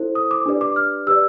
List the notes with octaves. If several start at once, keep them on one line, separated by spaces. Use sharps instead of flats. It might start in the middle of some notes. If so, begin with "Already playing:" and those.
Already playing: E4 A4 C5
D#6
D6
D4 G4 B4 D5
D6
F6
G4 B4 D5 E6